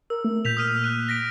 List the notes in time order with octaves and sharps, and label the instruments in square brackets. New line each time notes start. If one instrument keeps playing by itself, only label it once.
[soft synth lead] A#4 [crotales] E6
[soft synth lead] A3
[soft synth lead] A#2 [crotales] G6 B6 F7
[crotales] D#6 F6 D#7
F#6 D#7
A#6 B6 D7